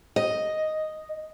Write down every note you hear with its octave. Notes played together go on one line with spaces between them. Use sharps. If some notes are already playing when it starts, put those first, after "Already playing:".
D#5